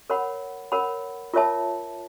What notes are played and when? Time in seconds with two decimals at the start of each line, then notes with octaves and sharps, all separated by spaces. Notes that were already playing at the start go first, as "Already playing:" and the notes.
0.10 A#4 C#5 F#5 B5
0.72 A#4 C#5 F#5 B5
1.34 F4 A#4 C#5 E5 A5